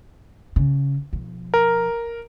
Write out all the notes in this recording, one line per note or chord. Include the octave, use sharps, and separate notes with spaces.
C#3
B1 F3
A#4